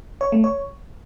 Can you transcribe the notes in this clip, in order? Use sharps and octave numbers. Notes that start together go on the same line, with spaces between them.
C#5
A3
C#5